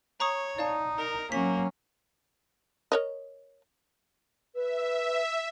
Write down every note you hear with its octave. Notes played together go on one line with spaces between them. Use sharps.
C#5 A#5 C#6 D#6
D#4 D5 F5 A5
A#4
F#3 A#3 C#4 B6
A#4 C#5 D#5
B4 E5